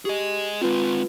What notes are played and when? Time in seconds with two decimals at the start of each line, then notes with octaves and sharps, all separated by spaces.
0.05 G4 G#4 D#5
0.61 G#3 C4 F4 B4